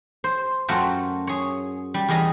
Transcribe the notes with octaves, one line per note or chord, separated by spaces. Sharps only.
C5
F#2 A3 F4 F#4 G5
G#4 C#5
G3
E2 G3 G#4 D#5 A#5